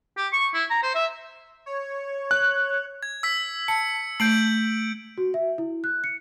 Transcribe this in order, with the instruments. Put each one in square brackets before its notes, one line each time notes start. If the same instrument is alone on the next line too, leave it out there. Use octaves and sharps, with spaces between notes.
[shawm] G4
C#6
E4
A#5
C5
E5
[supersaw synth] C#5
[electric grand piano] F#6
[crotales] G#6
E6 B6
[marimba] A5 [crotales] C#7
[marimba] A3 [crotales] G6 D7 F#7
[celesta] F#4
E5
E4
F#6
C#7